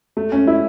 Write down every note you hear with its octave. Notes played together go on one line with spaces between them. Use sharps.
A3
C#4
E4